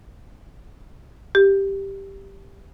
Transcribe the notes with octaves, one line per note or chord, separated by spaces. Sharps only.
G4